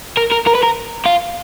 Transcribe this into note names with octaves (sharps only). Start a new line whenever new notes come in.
A#4
A#4
A#4
B4
A#4
F4